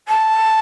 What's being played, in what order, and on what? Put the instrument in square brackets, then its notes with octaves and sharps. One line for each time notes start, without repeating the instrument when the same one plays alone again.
[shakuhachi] A5